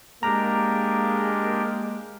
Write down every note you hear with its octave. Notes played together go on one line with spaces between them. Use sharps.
G#3 A#3 D4 G4 A#4 A#5